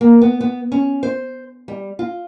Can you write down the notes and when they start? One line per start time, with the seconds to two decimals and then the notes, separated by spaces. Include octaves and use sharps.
0.01 A#3
0.22 B3
0.41 B3
0.72 C#4
1.03 C5
1.68 G3
1.99 F4